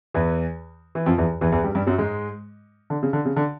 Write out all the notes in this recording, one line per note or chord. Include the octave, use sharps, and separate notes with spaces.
E2 E3
E3
F2 F3
E2 E3
E2 E3
E2 E3
G2 G3
G2 G3
F#2 F#3
G#2 G#3
D3
C#3
D3
C#3
D3